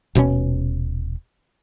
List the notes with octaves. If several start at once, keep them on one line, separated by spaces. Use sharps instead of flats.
D#1 B2 B3 C#4